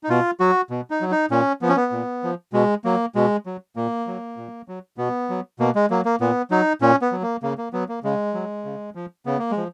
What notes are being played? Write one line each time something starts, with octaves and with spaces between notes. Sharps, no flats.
D#4
B2 F4
F#3 F#4
B2
D#4
F#3
D#4
A#2 C#4
F3 B3
C#4
B3
A#2
F3
B2 G#3
F#3 A#3
B2 G#3
F#3
A#2 A#3
F#3
A#2
F#3
B2 B3
F#3
B2 A#3
G#3
F#3 A#3
A#3
A#2 B3
F#3 D#4
A#2 C#4
B3
F#3
A#3
C#3 A#3
A#3
F#3 B3
A#3
C#3 G#3
F#3
C#3
F3
C#3 B3
A#3
G#3
F3